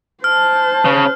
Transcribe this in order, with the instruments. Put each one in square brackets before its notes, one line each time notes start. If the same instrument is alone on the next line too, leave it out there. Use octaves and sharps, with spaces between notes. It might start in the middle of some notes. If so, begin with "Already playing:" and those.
[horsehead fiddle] C5 A5 [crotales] F6
[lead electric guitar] C#3